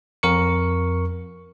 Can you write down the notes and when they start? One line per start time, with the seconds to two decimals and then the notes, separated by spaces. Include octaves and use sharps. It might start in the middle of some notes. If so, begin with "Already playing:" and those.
0.23 F2 A#4 C#6 C#7